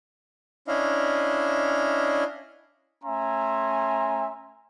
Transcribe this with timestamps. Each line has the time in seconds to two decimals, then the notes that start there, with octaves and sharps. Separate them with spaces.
0.68 C#4 D4 E4 D#5 F5
3.04 A3 C#4 E5 G#5 A#5 C6